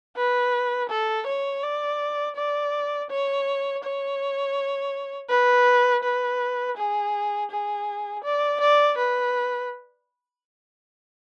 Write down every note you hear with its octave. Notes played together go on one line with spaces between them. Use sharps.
B4
A4
C#5
D5
D5
C#5
C#5
B4
B4
G#4
G#4
D5
D5
B4